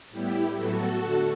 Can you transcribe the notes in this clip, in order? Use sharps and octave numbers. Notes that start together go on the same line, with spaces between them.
A2 G3 B3 E4 G4
A2 F#3 B3 F#4 A4
D3 A3